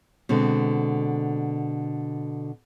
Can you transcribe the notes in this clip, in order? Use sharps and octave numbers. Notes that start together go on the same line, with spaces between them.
B2 D3 G#3 C4